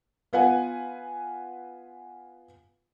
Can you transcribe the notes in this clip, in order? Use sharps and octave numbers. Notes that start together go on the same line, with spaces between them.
B3 F4 B4 F#5 G#5